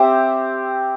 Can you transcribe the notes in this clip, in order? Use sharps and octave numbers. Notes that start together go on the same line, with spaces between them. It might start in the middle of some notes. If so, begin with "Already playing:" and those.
Already playing: C4 G4 C5 E5